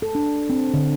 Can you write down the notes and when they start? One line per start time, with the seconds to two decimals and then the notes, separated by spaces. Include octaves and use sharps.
0.02 A4
0.15 D4
0.50 C4
0.74 D3